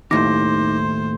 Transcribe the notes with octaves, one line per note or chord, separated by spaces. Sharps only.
D#2 A2 D#4 C5 D6 A#6